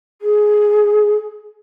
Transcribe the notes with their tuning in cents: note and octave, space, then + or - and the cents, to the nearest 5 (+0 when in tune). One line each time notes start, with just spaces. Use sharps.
G#4 +10